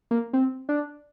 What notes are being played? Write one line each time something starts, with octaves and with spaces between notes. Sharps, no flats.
A#3
C4
D4